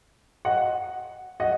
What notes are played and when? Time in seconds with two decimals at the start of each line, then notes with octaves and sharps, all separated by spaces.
0.45 D#5 F#5
1.40 D#5 F#5